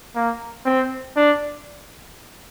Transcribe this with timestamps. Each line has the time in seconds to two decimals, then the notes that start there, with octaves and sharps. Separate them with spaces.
0.15 A#3
0.66 C4
1.16 D4